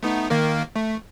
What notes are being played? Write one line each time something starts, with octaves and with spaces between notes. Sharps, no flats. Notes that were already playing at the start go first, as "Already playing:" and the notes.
A3 B3 D#4
D#3 A#3 A#4
A3